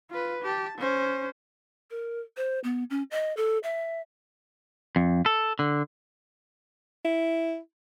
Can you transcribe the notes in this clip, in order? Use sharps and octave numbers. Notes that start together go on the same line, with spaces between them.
F4 B4
G4 A5
C#4 C5
A#4
C5
B3
C#4
D#5
A4
E5
F2
A4
D3
E4